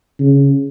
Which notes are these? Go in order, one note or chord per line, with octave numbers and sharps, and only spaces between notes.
C#3